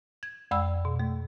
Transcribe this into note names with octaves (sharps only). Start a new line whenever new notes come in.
G#6
F2 G#3 D5 G5 B5 E6
B2
A3